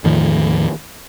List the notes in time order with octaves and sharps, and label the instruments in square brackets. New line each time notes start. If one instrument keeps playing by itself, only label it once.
[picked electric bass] E2 A2 D#3 F3